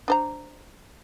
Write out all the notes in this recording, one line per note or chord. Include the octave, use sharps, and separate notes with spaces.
D4 C5 A#5